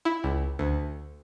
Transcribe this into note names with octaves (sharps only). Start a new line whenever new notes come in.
E4
C#2
D2